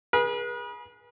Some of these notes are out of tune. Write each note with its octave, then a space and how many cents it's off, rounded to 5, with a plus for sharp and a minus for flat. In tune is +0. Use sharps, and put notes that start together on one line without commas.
G#4 +0 B4 -40